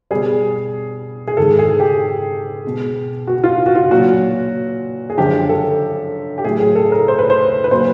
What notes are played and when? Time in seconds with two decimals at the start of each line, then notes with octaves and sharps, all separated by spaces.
0.11 B2 G3 G#4
1.28 G#4
1.37 G#2 D#3 G#3 A4
1.59 G#4
1.80 G4
2.65 B2 G#3
3.27 F#4
3.44 F4
3.66 F#4
3.75 F4
3.91 A#2 F#3 F#4
5.10 G#4
5.17 F#2 D3 F3 G#3 G4
5.49 A4
6.38 G4
6.45 A2 F#3 G#4
6.60 G#4
6.76 A4
6.92 A#4
7.08 C5
7.19 B4
7.30 C5
7.64 B4
7.71 A#2 F#3 C5